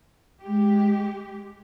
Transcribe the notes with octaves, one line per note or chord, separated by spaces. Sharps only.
G#3 G4